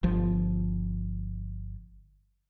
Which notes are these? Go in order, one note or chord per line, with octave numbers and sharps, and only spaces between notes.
G1 F3